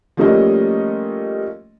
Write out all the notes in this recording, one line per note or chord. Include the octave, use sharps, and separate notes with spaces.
F3 G3 A3 A#3 C#4 D#5